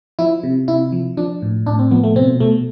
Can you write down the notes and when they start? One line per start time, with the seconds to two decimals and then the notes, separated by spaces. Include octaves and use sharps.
0.19 F3 E4
0.43 C3
0.68 C3 E4
0.92 F3
1.17 F3 D4
1.42 A2
1.66 A2 D4
1.79 C4
1.91 F3 B3
2.04 A3
2.16 B2 C4
2.40 B2 A3